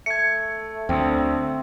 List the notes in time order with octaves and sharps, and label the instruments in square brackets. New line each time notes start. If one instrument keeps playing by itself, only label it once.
[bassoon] A3 [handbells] G#6 C#7
[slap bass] D2 [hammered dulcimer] C4